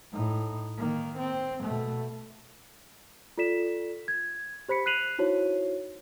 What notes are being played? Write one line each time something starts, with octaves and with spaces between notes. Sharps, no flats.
A2 D#4
D#3 A#3
C4
B2 A3
F4 A4 D5 B6 E7
G#6
G4 C5 B5 B6 C#7
F#6 B6 C7 D#7 F7 F#7
D#4 E4 F#4 C5 C#5